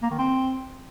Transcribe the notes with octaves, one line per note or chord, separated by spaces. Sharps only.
A#3
D#3
C4